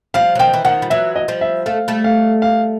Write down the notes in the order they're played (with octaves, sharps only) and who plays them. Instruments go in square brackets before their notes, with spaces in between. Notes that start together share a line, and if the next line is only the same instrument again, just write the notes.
[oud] F3 G3 [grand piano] F5
[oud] F#3
[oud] D#3 F3 [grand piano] G5
[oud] E3
[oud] D#3 F3 [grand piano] F#5
[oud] G3
[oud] E3 F#3 [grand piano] E5
[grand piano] D#5
[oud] F3 G3
[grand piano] E5
[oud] A3 [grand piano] F5
[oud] G3 A3
[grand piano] F5
F5